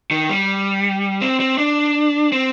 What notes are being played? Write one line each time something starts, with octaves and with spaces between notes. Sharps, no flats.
D#3
G3
C4
C4
D4
C4